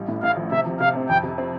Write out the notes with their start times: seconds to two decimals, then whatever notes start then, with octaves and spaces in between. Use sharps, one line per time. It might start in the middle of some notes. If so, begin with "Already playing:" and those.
Already playing: A1 G3
0.08 A2
0.22 A1 F5
0.37 F3
0.51 C3 E5
0.66 F3
0.80 C3 F5
0.95 C4
1.09 F2 G5
1.23 C3
1.38 C4